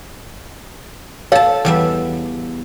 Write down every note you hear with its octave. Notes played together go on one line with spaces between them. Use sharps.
A4 C#5 F5 A5
E2 G3 E5